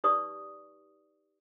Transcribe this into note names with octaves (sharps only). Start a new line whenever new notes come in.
D#4 G4 B4 D5 C#6 D#6